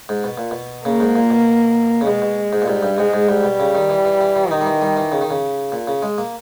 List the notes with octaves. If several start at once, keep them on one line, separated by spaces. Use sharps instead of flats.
G#2
B2
A#2
B2
C#3 A#3
G#2
A#2
B2
C#3
B2 G#3
B2
G#2
A#2
G#2 G3
G2
G#2 G#3
G#2
G#2 G3
B2
C#3
D#3
E3
E3
E3
E3
D#3 D#4
G3
E3
G3
E3
C#3
D#3
C#3
A#2
C#3
G#3
A#3